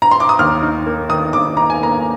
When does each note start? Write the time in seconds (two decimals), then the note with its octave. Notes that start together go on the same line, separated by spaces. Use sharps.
0.02 A#5
0.11 C6
0.20 D6
0.29 D#6
0.39 D#2 F6
0.62 D#4
0.86 A#3
1.09 D#3 D#6
1.33 D#2 D6
1.57 D#4 A#5
1.70 G#5
1.81 A#3 A#5